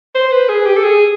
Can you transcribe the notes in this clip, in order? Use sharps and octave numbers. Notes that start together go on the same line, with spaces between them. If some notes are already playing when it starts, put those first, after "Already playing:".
C5
B4
G#4
G4
A4
G#4